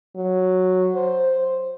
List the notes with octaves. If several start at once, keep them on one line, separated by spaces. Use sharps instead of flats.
F#3
C5